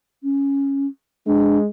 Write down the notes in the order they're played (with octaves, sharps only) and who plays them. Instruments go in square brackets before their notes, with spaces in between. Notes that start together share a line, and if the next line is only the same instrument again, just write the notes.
[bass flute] C#4
[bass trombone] G#3 [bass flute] D4